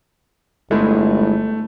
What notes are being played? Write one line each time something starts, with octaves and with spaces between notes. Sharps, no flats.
G1 G#3 A3 E4